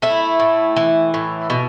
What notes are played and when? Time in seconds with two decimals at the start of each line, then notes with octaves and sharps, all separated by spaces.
0.02 A3 E4
0.40 A2
0.76 E3
1.14 A2
1.50 B2